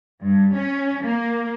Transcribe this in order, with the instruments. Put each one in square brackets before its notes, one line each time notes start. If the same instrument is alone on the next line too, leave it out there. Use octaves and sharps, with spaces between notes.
[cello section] G2
C#4
A#3